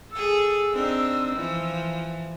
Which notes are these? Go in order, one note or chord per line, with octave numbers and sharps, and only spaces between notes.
G#4 A4 E6
C4 D4 D#4
E3 F3